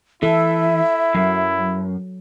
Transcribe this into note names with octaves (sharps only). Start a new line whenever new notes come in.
E3 E4 A4 E5
F#2 F#3